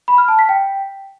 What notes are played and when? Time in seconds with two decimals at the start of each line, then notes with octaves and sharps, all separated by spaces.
0.08 B5
0.18 F6
0.28 A5
0.39 B6
0.49 G5